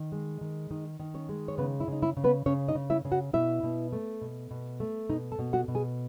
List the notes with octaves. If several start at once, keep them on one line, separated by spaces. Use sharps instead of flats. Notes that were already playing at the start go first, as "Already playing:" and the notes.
Already playing: D#3
G#3
D#3
D#3 D#4 D#5
D#3
C#4 C#5
G#3
C#5
C#3 B3 B4
E4
C#3 D#4
E4
C#3
B3 B4
C#3 C#4 C#5
D#4 D#5
C#3
E4 E5
C#3
F#4 F#5
B2 E4 E5
B2
A3
B2
B2
A3
B2 D#4 D#5
A4 A5
B2
F#4 F#5
B2
G#4 G#5